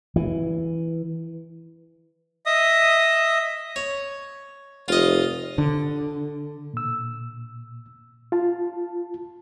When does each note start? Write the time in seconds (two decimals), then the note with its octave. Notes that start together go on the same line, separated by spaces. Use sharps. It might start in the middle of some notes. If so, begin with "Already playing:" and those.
0.16 E3
2.46 D#5 E5 D#6
3.76 C#5
4.88 F1 F4 D#5
5.58 D3
6.74 A#2 E6
8.32 F4 A5